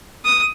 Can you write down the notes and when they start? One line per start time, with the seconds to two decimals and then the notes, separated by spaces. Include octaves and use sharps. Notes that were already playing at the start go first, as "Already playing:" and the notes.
0.25 D#6